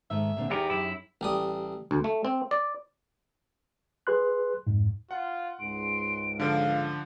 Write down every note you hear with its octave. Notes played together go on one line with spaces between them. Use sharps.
G#2 D#3 A3 E5
A#2 D3 C4
E2 B3 D#4 G4 G#4 A#4 E5
F#2 E4
A1 G3 D#6
D2
A3
C4
D5
G#4 B4 C6 F#6
F2 G#2
F4 F#5
C#2 G#2 C6 D7
D3 F3 F5